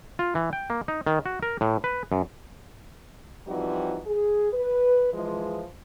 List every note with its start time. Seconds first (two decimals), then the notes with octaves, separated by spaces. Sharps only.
0.19 F4
0.35 E3
0.53 G5
0.70 A#3
0.88 D#4
1.07 D#3
1.26 F#4
1.43 A#4
1.61 A2
1.84 B4
2.12 F#2
3.47 E3 F3 G3 C4 D#4 F#4
4.06 G#4
4.53 B4
5.14 E3 F3 G#3